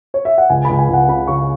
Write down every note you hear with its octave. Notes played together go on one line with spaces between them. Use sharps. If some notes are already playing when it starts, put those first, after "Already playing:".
C#5
E5
F#5
C#2 G#5
C#2 B5
G#5
C#2 F#5
C#3 B5
C#3 C#6